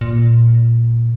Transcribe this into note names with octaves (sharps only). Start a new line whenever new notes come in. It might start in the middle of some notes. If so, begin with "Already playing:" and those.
A#2